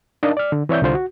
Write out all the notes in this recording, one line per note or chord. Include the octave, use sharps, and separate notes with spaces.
D4 D#4 A#4 D#5 F5 A5
D5 F6
D3
E3 C4 C#5 D5 E5 G6
C2 D3 F4 C5
F#4